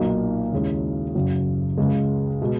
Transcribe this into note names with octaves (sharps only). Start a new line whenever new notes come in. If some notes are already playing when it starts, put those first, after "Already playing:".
Already playing: B1 A#2 F#3 A#3 D#4
D#2 C#3 G#3 C#4 E4
F#1 F#2 C#3 F#3
C#2 C#3 G#3
B2 G#3